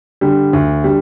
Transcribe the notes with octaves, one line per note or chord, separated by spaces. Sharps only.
D3 G3
D2
D3 G3